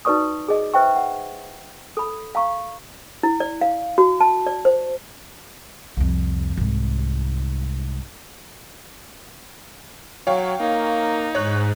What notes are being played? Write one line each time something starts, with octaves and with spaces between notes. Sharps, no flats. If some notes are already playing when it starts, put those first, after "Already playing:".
D#4 F#4 B4 D5 C#6 D#6
G#4 D#5
B4 C5 E5 G5 C#6
F#5
A4 B5
F5 A#5 C#6
E4
D5
F5
F#4
A5
D5
C5
C2 F2
C2 G#2
F#3 C#5 F5 G5
A#3 D#4
G#2 C#5 F#6